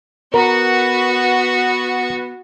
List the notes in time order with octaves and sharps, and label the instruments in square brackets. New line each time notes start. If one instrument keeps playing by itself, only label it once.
[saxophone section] B3 [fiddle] F#4 C#6 [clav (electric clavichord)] A#4